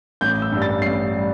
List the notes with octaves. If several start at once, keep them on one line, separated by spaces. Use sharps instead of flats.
A1 G6
E6
G2 G3
A6
A1 C7
G3